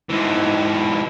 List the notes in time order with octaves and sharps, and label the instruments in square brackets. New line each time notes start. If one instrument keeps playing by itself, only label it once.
[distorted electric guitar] G#2 E3